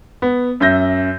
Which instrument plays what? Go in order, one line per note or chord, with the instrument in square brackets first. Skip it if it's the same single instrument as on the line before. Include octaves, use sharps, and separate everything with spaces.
[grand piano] B3
F#2 E5 G6 A#6